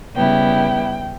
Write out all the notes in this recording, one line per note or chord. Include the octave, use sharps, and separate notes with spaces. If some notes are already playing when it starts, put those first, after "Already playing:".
C#3 G3 B3 E4 G5